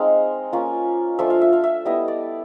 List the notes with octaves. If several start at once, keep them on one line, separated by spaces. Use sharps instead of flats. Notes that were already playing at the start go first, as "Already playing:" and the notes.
Already playing: G#3 C4 D#4 F5
A#3 C#4 F4
F3 A3 D4 F4 E5
F5
E5
F5
E5
G3 B3 E4 D#5
D5